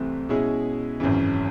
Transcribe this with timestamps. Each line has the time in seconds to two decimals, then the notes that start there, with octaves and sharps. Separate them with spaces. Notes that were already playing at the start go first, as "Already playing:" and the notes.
Already playing: C2 C3 E3 A3 C4
0.29 B2 G#3 C#4 E4 G#4
1.00 G#1 F#2 C#3 E3